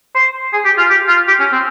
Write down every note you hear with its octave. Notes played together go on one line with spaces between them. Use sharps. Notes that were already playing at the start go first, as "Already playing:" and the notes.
C5
G#4
G4
F4
G4
F4
G4
C#4
C4